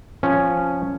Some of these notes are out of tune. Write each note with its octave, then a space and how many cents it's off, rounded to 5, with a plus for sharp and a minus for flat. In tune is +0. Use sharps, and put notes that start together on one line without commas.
F3 +0 C#4 +0